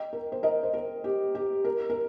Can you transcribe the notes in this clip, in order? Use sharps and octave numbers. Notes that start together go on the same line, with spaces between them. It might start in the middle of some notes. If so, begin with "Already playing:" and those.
Already playing: D#5 G5
A#4
C5
A#4 D#5
C5
A#4
G4
G4
A#4
A#4